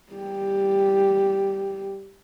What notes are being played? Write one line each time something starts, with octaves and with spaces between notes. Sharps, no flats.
G3 G4